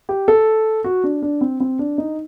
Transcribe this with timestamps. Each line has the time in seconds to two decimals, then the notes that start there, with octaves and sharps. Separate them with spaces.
0.09 G4
0.28 A4
0.84 F#4
1.04 D4
1.22 D4
1.41 C4
1.60 C4
1.79 D4
1.98 D#4